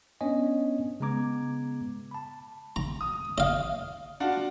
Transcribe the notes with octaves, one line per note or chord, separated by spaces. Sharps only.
B3 C#4 D4 C#5 D#5 G#5
C#3 G#3 B3 A#5 D6 G#6
A5 B5
A#5
D#6
D#5 F5
D4 F4 F#4